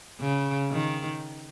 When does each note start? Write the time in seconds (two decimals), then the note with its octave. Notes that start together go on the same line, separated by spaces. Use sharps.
0.21 C#3
0.71 D#3